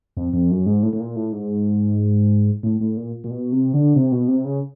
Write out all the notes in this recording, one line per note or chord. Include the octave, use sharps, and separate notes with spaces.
F2
F2
F#2
G#2
A2
A2
A#2
A2
G#2
A2
A2
A#2
A#2
B2
C3
D3
C3
B2
C3
C#3